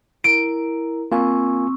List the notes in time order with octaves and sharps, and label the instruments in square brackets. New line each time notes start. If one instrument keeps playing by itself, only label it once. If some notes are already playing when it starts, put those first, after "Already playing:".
[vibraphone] E4 A#4 A#5 [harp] D7
[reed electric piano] A#3 F4 G#5 [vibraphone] C4 C#6 E6